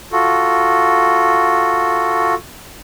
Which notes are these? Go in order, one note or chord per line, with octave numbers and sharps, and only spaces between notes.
F4 F#4 A4